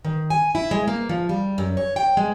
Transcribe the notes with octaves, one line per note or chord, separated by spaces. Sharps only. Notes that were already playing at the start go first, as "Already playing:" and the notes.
D#3
G#5
E4
G#3
A#3
F3
G3
F#2
C#5
G5
G#3